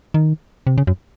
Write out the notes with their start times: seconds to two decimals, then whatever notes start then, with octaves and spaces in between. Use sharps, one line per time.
0.14 D#3
0.67 C3
0.78 C#3
0.87 F#2